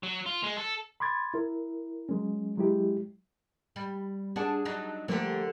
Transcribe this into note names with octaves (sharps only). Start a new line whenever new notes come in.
F#3
F4
G#3
A4
B5 C6 D6 G#6 A6
E4 A#4
F#3 G#3 C#4
F#3 G#3 E4 G4
G3
D4 G#4 F#5 A5
F#3 D4 D#4
D3 F3 A3 A#3 G4